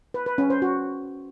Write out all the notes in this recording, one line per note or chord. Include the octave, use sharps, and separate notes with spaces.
B4
B4
C#4
C5
F#4